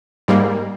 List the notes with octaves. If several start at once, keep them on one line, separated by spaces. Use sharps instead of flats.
G#2 G3 A#3